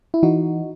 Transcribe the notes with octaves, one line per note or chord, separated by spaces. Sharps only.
E4
E3 D#4 F#4